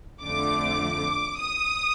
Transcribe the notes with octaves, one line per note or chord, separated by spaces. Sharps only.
F2 D3 F3 A3 D6
D#6